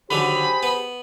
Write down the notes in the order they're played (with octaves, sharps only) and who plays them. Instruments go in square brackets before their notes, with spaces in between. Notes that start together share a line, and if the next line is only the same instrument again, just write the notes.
[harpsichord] D3 D#3 F#3 [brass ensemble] G4 G#4 C5 [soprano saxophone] B5
[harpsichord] B3